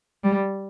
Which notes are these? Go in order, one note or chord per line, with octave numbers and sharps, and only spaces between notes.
G3